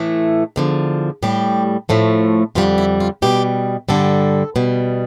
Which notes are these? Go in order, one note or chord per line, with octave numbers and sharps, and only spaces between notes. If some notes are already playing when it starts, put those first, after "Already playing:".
Already playing: A2 E3 A3
E2 D3 F3
A2 G3 G4
A2 F3 A3
F2 D3 G3 F4
E4
F4
B2 G3 G4
G2 D3 G3 A4
B2 G3